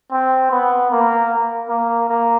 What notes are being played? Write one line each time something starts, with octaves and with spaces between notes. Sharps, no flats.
C4
B3
A#3
A#3
A#3